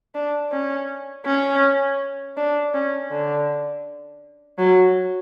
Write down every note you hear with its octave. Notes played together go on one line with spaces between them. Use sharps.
D4
C#4
C#4
D4
C#4
D3
F#3